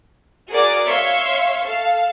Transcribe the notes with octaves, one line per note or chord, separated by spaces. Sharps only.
F#4 G#4 A#4 D5 D6
C#5 E5 F5 C6 C#6
A4 F5